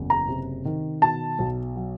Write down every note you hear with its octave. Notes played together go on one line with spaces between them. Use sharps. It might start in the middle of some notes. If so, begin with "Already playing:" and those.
Already playing: F#1 E2
A#5
C3
D#3
B2 A5
B1
F#3